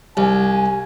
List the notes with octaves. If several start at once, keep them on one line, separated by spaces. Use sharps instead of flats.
C2 G#5